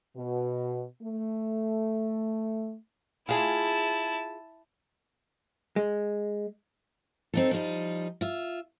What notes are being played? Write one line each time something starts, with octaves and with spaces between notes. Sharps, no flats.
B2
A3
E4 F4 G#4 A5
G#3
C4 D#4 A4
F3 G3 D#4
F4 E5